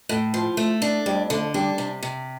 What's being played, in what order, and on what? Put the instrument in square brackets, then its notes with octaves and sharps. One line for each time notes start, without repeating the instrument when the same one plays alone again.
[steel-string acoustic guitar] A2 [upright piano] A3
[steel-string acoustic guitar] F3
A3
D4
[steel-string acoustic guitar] F2 [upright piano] G3
[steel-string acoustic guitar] D3 [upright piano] A3
[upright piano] G3 [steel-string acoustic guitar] D4
[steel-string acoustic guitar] C3
C3